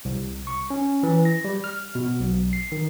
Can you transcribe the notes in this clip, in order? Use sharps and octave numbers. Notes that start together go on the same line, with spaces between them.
C2
C#6
C#4
E3
A#6
G3
F6
B2
B1
C7
D#3